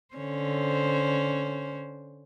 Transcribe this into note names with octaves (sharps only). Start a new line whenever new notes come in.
D3 C#4 C5